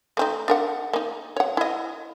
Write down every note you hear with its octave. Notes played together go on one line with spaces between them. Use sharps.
A3 C4 D#4
D4 A#4 F#5
A#3 D#4
C#5 F#5
E4 D#5